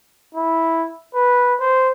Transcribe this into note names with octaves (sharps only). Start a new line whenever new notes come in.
E4
B4
C5